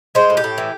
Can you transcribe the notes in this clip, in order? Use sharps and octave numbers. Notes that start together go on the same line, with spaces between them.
G#3 C5
A2
G4
A2
E3